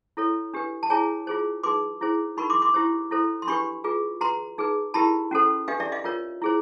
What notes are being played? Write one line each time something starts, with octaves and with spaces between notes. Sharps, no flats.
E4 A4 C#5
D4 G4 B4
A5
E4 G#4 C#5 G#5 A#5
F4 G#4 C5
D#4 G#4 B4 C6 D6
E4 G#4 C5
D#4 F#4 A#4 B5 C#6
C6 D6
C6 D6
E4 G4 C5
E4 A4 C5
C6
D4 G4 B4 B5 C#6
F4 G#4 B4
F#4 B4 A#5 C6
D#4 G#4 B4
E4 G4 A#4 A5 B5
C#4 F#4 A4 C5
D4 G4 B4 D#5 F5
D5 E5
D#5 F5
F4 A#4 C#5
E4 G#4 C5